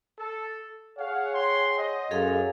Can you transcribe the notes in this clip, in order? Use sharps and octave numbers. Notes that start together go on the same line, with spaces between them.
A4
G#4 C#5 F5 F#5
G5 C6
C5 D#5
F#2 G#4 A4 F5